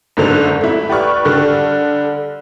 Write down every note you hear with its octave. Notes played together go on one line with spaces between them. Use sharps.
F#1 G#2 D3 F7
A3 E4
G4 B4 D5 C#6 F6
D3 G3 F#6